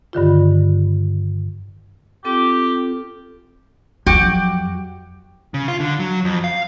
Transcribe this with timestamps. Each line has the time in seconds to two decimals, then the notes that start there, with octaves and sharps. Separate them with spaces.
0.13 G2 D3 D#3 F4
2.25 C4 F4 G4 A4
4.06 F2 F#3 F#4 G4
5.54 C#3
5.68 F4
5.80 D3
6.00 F#3
6.24 F2
6.44 F5